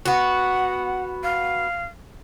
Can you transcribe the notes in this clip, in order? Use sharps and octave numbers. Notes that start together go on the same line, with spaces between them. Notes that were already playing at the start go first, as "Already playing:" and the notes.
B3 F#4 F#5
F5